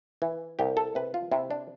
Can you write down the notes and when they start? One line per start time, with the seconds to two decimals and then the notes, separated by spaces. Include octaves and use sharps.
0.22 E3
0.59 C2 G4
0.77 A4
0.95 C3 B4
1.14 F4
1.32 C3 E4
1.51 D4